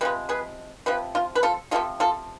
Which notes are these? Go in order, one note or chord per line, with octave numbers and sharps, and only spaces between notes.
C3 F3 G#3 B4
G#4 B4
C3 F3 B4
F4
B4
F4 A4
C3 F3 G#3 F4 A4
F4 A4